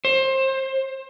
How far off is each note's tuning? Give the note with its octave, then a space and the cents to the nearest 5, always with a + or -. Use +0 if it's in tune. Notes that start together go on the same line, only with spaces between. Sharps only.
C5 +25